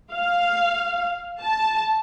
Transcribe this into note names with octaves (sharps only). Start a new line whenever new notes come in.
F5
A5